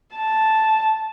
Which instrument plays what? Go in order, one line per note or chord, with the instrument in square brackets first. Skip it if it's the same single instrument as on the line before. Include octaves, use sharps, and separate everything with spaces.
[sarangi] A5